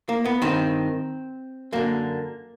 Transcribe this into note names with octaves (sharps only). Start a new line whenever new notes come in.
A#3
B3
G2 D#3 C4
F#2 D3 A#3